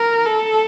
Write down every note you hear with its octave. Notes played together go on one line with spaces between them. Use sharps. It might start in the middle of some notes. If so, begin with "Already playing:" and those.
Already playing: A#4
A4